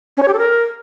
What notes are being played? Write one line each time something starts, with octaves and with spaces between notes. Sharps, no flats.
C#4
C#5
G4
A4
A#4